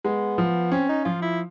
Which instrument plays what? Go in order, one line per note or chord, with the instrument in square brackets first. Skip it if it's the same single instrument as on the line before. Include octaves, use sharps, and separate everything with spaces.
[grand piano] G#3 [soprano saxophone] B3
[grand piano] F3
[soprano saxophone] C4 [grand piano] C#4
[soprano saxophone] D#4
[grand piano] F3 [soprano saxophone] F4
[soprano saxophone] E4